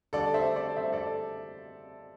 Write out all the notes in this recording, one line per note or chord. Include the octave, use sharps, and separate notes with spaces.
D3 G3 A4 D5
C5 E5
A4 D5
D3 G3 C5 E5
A4 D5